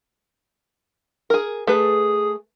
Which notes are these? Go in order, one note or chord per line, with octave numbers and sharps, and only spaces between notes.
G#4 A#4
A3 G#4 B4